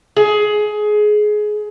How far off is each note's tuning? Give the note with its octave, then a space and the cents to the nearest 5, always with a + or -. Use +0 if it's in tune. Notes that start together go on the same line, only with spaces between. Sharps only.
G#4 +20